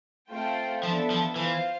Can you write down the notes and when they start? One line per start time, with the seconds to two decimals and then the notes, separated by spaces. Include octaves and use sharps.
0.31 A3 C4 F4 C5 G5
0.83 F3 B3 D4 A4 E5
1.10 F3
1.36 E3 F4 C5 F5